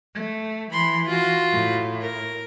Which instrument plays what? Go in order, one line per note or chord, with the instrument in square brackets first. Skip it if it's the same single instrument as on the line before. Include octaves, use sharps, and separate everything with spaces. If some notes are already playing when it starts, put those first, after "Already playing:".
[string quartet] A3
[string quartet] E3 [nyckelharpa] B5 C6
[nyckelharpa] F4 F#4
[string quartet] A2
[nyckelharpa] A#4